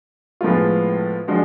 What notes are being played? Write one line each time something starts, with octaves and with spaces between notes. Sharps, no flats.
A2 F3 G#3 B3 F4
F3 G#3 D4 F#4